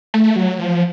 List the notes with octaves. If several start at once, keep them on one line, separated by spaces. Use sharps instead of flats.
A3
F#3
F3